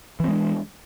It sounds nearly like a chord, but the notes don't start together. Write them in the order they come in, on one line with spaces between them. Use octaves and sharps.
E3 C4 G#3 D4